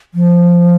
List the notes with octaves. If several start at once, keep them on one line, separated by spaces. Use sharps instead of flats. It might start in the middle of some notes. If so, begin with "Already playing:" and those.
F3